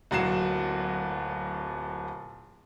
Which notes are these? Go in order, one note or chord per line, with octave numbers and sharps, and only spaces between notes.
D1 A#2 F#3 F#4 C7 E7